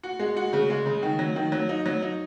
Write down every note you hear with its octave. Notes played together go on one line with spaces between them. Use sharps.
F#4
G#3
F#4
C#3
G#3
C#3
D#3
F#3
D#3
F#3
D#4
F#3
D#4